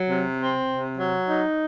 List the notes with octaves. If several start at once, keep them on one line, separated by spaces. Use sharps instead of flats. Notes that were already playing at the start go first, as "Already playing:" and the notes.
Already playing: F#3
C3
C4
C3
F#3
D#4